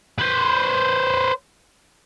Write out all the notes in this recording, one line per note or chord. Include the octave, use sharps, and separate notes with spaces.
B4 C5